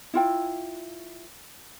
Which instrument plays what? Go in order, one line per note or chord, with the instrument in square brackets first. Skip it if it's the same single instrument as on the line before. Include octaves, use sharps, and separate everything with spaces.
[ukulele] E4 F4 G5